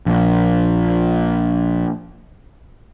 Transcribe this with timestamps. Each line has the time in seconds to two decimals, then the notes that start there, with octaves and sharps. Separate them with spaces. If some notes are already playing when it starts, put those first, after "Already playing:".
0.06 A#1 A#2